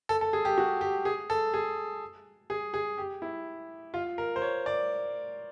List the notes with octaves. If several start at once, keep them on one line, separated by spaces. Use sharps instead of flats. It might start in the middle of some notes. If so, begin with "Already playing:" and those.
A4
A4
G#4
G4
F#4
G4
G#4
A4
G#4
G#4
G#4
G4
E4
F4
A#4
C5
C#5
D5